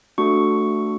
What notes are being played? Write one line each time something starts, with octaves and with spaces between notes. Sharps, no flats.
A3 D4 F#4 A4 C#6